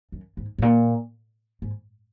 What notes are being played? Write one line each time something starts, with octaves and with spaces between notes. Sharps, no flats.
F#2
G#2
G#2
A#2
G#2